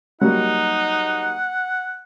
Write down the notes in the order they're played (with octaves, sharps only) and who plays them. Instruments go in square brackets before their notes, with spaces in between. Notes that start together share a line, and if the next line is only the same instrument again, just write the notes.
[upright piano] F#3 G3 A#3 [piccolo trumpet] D#4 [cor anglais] F#5